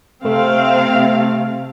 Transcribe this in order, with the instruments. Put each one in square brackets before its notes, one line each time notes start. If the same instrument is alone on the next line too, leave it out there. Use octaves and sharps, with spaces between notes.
[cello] C3 [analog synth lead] A3 [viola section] C4 F5